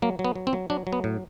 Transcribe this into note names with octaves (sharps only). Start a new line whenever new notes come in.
F#3 A#3
F#3
B3
F#3
C4
F#3
F#3 D4
F#3
B3
A2